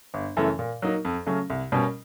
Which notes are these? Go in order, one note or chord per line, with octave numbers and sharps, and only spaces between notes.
G1
F#2 C#3 E3 A3
A#2
F#3 A#3 D#4
F2
C#3 F#3 A3 C#4
C2
B2 G3 A#3 C#4